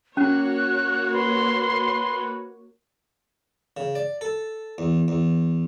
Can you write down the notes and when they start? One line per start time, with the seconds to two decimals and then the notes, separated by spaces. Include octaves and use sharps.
0.17 A#3 C#4 F#4 C#5 F#6
1.13 B4 C6
3.77 C#3
3.95 D5
4.21 A4
4.78 E2
5.08 E2